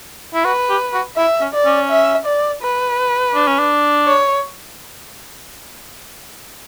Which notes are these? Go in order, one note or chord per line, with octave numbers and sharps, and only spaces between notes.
E4
F#4 B4
G4
F#4
E4 E5
C#4
D5
C#4
E5
D5
B4
D4
C#4
D4
C#5